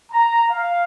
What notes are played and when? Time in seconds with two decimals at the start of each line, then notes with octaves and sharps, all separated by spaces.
0.12 A#5
0.50 F5